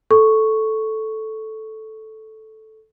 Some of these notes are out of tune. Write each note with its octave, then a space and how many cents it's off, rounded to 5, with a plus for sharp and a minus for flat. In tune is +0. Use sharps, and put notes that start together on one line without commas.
A4 -5 C#6 +0